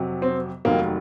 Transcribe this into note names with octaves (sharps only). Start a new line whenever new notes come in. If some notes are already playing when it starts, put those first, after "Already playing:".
Already playing: F2 C3 F#3
C4
F1 D#2 D#3 F#3 A#3